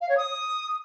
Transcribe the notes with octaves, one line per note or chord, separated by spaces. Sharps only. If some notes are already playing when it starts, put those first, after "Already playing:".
F5
C#5
D#6